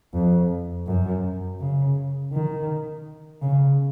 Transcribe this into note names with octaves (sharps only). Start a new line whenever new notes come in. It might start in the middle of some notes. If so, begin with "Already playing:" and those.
F2
F#2
C#3
D#3
C#3